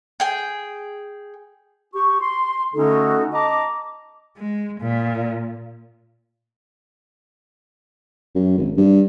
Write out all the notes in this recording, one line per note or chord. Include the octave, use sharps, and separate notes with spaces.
G#4 G5
G4 C#6
C6
D3 A3 C#4 D#4 F#4 A4
D#5 A5 A#5 D6
G#3
A#2
F#2
G#1
G2